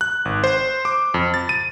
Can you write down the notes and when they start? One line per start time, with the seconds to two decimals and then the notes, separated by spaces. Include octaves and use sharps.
0.01 F#6
0.25 G#1
0.44 C5
0.85 D6
1.14 F2
1.34 A6
1.49 D#7